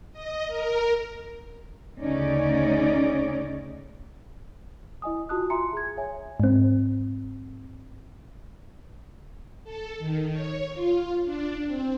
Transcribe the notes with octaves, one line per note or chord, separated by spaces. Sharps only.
D#5
A#4
D2 C#3 C#4 D#4 D5
E4 D#5 G#5 D#6
F4 F#4 A5 D#6 F#6
F4 E5 G#5 A#5 C6 C#7
G#4 G#6
C#5 E5 G#5
G#2 C4
A4
D#3
C#5
F4
D4
C4